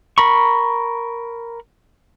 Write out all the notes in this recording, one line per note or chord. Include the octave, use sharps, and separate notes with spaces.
A#4 B5 C#6